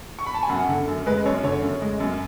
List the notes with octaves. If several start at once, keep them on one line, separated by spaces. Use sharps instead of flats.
C#6
B5
A5
G#5
F#2 F#5
D3
F#2
G#3 B4
F#2 C#5
D3 C#5
F#2
G#3
F#2